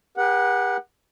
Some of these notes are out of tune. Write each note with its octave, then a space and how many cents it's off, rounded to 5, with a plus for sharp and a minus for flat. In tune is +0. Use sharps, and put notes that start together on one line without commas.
G4 +35 B4 -45 F#5 +0